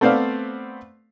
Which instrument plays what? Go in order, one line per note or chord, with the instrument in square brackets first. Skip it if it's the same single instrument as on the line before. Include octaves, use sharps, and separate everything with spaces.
[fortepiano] A3 B3 C4 C5 D5 F5